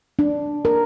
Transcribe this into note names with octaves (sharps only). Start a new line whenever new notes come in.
D4
A#4